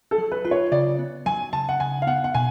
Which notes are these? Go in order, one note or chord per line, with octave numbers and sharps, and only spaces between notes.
A4
F#3
B4
F4 B4
C#5
C#3 D5
B3
F#3 G#5
C#3 A5
F#5
C#3 G#5
F5
B3 F#5
F#5
B2 G#5